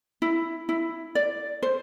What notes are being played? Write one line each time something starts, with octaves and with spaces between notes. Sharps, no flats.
E4
E4
D5
C5